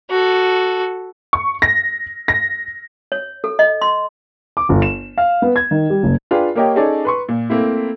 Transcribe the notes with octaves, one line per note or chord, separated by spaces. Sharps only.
F#4 A4
C#6
A#6
A#6
C#5
A4
D#5
C6
D6
G1
E7
F5
B3
G#6
D#3
G3
F#1
D4 F4 G#4 B4 G5
A#3 G4 A#4 C#5 D#5 G5
C#4 D#4 G#4 A4 C#5 D5
B4 C6 C#6
A#2
A3 A#3 C4 E4